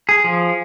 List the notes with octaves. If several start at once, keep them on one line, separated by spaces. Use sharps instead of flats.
G#4
F3